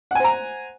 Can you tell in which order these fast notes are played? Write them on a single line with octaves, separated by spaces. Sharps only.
F#5 G#5 C5 A#5